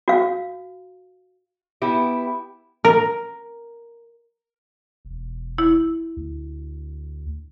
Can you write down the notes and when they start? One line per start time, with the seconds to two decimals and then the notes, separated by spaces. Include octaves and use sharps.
0.08 F#4 F5
1.82 B3 E4 G4
2.85 A#4
5.05 E1
5.58 E4
6.17 D2